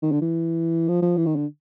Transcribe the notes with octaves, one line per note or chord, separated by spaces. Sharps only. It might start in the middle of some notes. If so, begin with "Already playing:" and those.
D#3
D3
E3
F3
F3
E3
D#3
D3